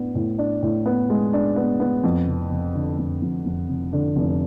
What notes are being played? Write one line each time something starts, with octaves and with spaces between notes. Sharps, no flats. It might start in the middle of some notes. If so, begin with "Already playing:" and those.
Already playing: A2 B3 D4
A2
D4
A2
B3
G#3
D4
B3
B3
F2
F1
F1
D3
F2
F2
F2
F1
D3
F1